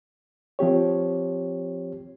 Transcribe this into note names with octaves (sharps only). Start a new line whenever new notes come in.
F3 C4 G4 C#5